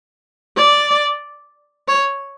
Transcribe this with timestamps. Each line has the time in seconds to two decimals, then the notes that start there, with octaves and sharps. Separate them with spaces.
0.57 D5
1.88 C#5